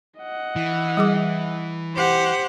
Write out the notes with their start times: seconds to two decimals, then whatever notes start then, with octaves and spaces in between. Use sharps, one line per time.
0.19 D#5 F#5
0.56 E3
0.97 G3 G#4 D6
1.96 G4 C5 F#5